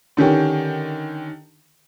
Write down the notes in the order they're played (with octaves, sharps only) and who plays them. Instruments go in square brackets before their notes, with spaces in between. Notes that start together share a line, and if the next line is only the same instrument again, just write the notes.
[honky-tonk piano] D3 D#3 C#4 G4